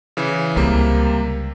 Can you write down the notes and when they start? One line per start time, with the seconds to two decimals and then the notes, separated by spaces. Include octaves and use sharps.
0.17 C#3 E3
0.56 C#2 C3 G3 A#3